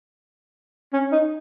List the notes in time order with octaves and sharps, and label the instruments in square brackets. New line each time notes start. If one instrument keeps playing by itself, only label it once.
[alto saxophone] C#4
D#4